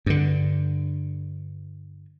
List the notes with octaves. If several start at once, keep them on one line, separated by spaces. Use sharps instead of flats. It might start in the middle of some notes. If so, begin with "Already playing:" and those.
G2 D3